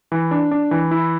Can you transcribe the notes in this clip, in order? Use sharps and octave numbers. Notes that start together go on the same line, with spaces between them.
E3
D4
D4
E3
E4